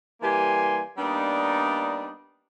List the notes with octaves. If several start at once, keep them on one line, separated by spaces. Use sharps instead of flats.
E3 G3 A#3 G4 G#5 C6
G3 A#3 B3 D4 D#4